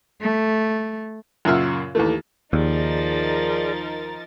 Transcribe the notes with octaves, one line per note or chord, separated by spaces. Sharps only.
A3
F#2 A#2 C#3 E5 F#5 F6
D#2 E3 A3
D#2 F3 D#4 G#4 A#4 D5 A6